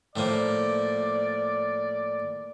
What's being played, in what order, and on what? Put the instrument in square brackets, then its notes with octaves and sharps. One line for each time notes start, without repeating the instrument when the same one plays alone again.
[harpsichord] A2 F3 A#3 [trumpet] D5